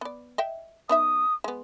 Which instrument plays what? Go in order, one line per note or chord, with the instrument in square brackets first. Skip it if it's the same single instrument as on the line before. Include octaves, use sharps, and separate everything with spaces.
[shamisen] B3 D5
D#5 E5 G5
[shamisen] B3 D#4 E5 [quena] D#6
[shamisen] G#3 B3